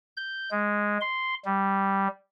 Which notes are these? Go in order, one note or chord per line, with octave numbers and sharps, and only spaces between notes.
G6
G#3
C6
G3